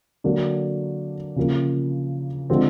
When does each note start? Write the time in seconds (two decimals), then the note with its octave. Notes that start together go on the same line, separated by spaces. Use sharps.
0.24 D3 F#3 A#3 D4
1.36 C#3 F3 A#3
2.50 D3 F3 G#3 C4